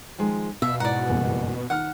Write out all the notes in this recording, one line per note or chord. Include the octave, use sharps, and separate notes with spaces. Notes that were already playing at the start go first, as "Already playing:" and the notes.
D#3 F3 G#3
B2 E5 F5
G#2 E4 D5 F#5 A#5
F#1 E2 G2
D#3 F#5 F6